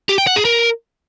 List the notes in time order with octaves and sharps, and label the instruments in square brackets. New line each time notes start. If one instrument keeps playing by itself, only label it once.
[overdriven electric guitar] G4
G5
F#5
G#4
A#4